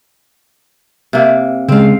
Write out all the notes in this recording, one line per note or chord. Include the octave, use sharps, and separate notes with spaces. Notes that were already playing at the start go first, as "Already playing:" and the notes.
C3 A#3
C#3 G#3 C4 F5